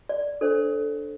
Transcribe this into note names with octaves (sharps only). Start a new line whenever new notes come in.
D5
D4 A4 C5